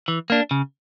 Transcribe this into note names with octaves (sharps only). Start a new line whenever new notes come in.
E3
A#3 D4
C#3